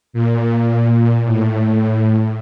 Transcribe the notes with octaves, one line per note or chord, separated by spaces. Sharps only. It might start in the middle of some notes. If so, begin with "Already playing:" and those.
A#2
A2